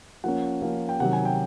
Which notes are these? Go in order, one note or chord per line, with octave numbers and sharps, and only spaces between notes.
F3 A#3 C#4 F#5
F3 A#3 C#4
G5
C3 D#3 F#3 F#5
G#5
G5